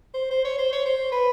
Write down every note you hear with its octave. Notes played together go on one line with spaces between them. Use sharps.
C5
C5
C#5
C5
C#5
C5
B4